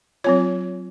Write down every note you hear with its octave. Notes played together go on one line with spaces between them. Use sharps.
F#3 C4 F4 C#5